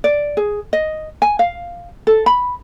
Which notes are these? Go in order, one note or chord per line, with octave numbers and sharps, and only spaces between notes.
D5
G#4
D#5
G#5
F5
A4
B5